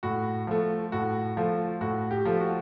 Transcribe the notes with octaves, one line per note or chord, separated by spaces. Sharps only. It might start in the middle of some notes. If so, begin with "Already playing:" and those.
A2 F#4
F3 A3
A2 F#4
F3 A3 F4
A2 F#4
G4
F3 A3
F#4